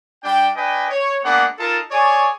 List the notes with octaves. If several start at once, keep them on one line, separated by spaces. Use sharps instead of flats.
G3 D4 G5
D4 B4 D#5 G5 G#5
C#5
G#3 A#3 B3 D4 F#5
D#4 F4 A4 A#4 A5
G#4 C#5 D5 G#5 C#6